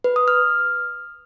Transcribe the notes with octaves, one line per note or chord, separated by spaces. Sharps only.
B4
D#6
F6